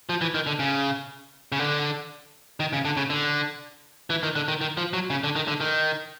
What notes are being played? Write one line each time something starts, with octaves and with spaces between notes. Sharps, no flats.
F3
E3
D#3
D3
C#3
C#3
D3
D#3
C#3
D3
C#3
D3
E3
D#3
D3
D#3
D#3
F3
F#3
C#3
D3
D#3
D3
D#3